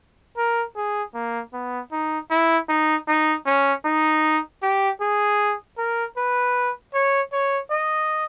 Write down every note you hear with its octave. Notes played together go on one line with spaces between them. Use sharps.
A#4
G#4
A#3
B3
D#4
E4
D#4
D#4
C#4
D#4
G4
G#4
A#4
B4
C#5
C#5
D#5